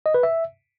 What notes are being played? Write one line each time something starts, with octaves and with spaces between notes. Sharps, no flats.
D#5
B4
E5